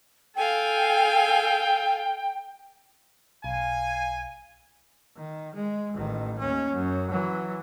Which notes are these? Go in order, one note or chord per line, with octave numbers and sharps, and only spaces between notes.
A4 F5 G5 G#5
B1 F5 G#5
D#3
G#3
A1 D#3
D#2 C#4
F#2
E3 F#3